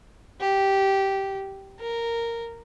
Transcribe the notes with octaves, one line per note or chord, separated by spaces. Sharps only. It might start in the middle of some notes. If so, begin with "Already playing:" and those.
G4
A#4